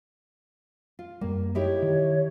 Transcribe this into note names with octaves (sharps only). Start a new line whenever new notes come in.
F4
F#2 G3 A#3
D#4 E4 G4 C#5
D#3